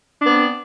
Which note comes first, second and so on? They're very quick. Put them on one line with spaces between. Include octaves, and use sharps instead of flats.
D4 B3 C4